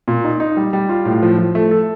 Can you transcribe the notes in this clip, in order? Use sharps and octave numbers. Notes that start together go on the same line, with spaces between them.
A#2
D#4
D#4
G3
G3
F4
A2
F3
F3
A3
A4